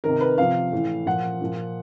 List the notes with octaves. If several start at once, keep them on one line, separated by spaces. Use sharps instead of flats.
C3 D#3 A#4
B4
C3 F3 F5
A2 E3
A#2 F3 F#5
A#2 F3